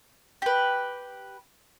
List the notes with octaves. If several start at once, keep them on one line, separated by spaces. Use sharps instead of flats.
G4 B4